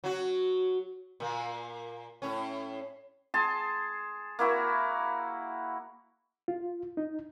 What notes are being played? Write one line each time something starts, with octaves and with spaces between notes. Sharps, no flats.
F#3 F#4
A#2 A#3
A2 C#4
G#4 A5 C6
A#3 E4 F#4
F4
D#4